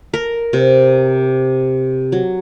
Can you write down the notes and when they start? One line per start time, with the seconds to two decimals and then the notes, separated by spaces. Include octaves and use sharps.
0.14 A#4
0.53 C3
2.12 F#3